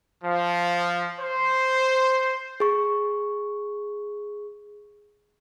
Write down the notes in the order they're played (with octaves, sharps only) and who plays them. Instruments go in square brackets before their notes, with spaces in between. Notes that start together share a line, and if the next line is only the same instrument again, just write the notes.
[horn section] F3
C5
[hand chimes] G#4 C#6